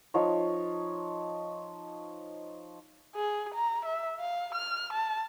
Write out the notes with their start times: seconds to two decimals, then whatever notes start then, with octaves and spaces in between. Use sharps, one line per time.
0.14 F3 D#4 C#5
3.16 G#4
3.54 A#5
3.85 E5
4.19 F5
4.55 F6
4.93 A5